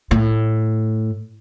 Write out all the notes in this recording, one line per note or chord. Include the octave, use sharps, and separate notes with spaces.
A2